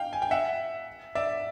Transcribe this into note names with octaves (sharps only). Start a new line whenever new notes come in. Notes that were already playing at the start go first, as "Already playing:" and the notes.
Already playing: F5 G5
G#5
G5
E5 F#5
D5 E5